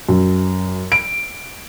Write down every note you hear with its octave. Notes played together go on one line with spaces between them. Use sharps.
F#2
D7